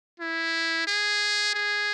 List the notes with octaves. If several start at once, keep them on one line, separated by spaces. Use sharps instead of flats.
E4
G#4
G#4